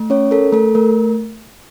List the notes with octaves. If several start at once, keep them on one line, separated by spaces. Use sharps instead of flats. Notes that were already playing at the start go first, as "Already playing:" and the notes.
Already playing: A3
C#4 C#5
A4 A#4
A3 A4
A3 A#4